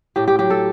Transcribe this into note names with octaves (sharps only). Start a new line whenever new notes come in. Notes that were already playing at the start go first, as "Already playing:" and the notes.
A2 G4
G4
F#3 G4
A4